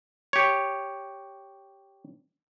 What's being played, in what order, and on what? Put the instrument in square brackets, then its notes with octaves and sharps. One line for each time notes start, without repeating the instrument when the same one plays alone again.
[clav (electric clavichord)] G4 C#5